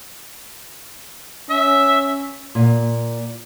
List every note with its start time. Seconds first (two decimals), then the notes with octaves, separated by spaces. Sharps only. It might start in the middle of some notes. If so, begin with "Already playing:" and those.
1.50 C#4 E5
2.55 A#2